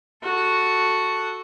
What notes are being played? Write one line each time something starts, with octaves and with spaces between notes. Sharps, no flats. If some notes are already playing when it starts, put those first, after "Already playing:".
F#4 A4